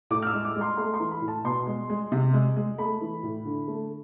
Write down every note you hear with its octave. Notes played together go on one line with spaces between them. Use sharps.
A2 D6
F6
E6
G#3
D6
G#3
C6
A3 C6
C6
E3
B5
A2
A5
B2 C6
G#3
G#3
C3
G#3
G#3
A3 B5
E3
A2
D3
A3